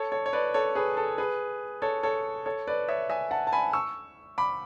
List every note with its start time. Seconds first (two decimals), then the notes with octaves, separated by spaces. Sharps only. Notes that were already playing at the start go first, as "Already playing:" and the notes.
Already playing: A4 C#5
0.12 A4 C#5
0.26 C#5
0.33 B4 D5
0.54 A4 C#5
0.75 G#4 B4
0.97 A4
1.18 G#4 B4
1.82 A4 C#5
2.03 A4 C#5
2.46 A4 C#5
2.67 B4 D5
2.89 C#5 E5
3.10 E5 G#5
3.31 F#5 A5
3.47 A5
3.53 G#5 B5
3.73 C#6 E6
4.38 B5 D6